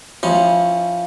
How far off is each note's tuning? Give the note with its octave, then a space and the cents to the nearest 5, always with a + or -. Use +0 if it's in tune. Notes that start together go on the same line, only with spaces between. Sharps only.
F3 +0 C#4 +0 E4 -15